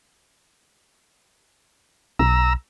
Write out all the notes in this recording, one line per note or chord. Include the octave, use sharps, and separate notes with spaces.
B1 A#5 E6